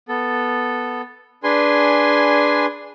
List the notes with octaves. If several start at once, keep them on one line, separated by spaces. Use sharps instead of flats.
B3 A4
D4 G#4 B4 G#5 C6